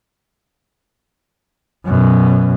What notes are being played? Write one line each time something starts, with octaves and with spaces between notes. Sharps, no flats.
F#2 B2